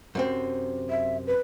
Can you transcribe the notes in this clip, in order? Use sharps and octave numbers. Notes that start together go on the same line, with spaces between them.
F#2 C3 C4
E5
B4